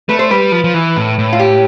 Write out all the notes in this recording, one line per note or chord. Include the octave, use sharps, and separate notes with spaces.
A3 B4
C5
G3 B4
F3
F3
E3
A2
A2
F4
G4